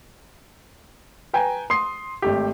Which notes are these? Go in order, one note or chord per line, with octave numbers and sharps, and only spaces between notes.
B4 G5 G#5 A#5
C6 D#6 C7
G#1 A3 G4